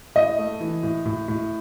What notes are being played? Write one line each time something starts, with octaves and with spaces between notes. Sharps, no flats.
A2 D#5
A3
E3
A2
A2
A2